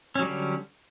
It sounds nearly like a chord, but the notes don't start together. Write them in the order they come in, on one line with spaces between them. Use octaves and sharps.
C#4 F#3 G3 D3